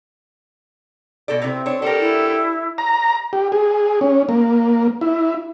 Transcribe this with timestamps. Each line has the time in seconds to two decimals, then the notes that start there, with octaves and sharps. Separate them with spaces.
1.28 B2 A4 D5
1.42 C3 C4 E4
1.66 D4 C#5
1.82 D4 G4 A4 A#4
2.00 E4
2.78 A#5
3.33 G4
3.52 G#4
4.01 C#4
4.29 A#3
5.01 E4